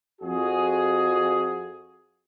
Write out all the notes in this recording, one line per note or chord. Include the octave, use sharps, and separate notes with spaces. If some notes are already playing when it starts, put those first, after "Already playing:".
F2 F#4 G#4